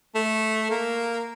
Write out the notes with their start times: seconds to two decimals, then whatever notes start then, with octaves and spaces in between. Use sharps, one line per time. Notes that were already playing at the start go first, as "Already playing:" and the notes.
0.15 A3
0.71 A#3